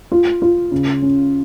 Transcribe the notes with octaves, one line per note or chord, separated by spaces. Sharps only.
F4
F4
C#3
C#4